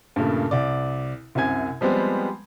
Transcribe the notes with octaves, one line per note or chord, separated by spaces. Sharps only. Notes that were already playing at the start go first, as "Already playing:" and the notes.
G2 A#2 C#3 A3
C2 D5
C2 F#2 C3 G#5 G#6
F3 G3 G#3 B3 C4